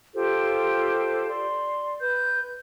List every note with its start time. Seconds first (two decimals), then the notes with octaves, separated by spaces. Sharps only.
0.15 F4 G4 A4 C5
1.29 D5 C6
2.01 B4 G6